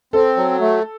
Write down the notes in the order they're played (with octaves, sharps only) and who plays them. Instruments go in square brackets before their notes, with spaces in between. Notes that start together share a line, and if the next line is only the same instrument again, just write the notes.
[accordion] C4 [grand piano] A4
[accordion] F#3
A3